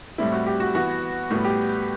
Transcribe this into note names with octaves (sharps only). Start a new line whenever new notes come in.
A2 G3 C4 E4
F#4
G4
F#4
E3 B3 F#4
A2 G3 B3 F#4
G4